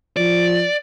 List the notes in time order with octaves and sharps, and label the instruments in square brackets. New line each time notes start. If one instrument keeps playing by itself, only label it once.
[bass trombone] F3 [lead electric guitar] D5